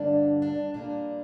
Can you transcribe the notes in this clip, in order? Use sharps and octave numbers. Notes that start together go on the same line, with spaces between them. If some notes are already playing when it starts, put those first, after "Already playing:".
Already playing: G2 D3 G3 A#3 D4
D4
A#2 G3 A#3 D4